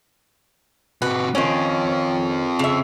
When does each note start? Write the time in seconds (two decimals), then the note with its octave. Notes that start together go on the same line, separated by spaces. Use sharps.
1.02 C3 F#4 B4
1.35 D#3 C4 C#4 F4
2.59 C#3 E5